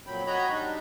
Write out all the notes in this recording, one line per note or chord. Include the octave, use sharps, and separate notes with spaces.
F2 A#2 F#3 G5 B5
F#4 C#5 D#5 A#5 B5
G3 D4 D#4